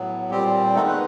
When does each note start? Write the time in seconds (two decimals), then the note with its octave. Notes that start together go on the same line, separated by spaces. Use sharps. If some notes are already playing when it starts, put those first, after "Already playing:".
Already playing: A2 F#3 B3
0.31 A#2 G3 C4 G4
0.75 D#3 G#3 A3 B3 D#4 A4
0.88 B4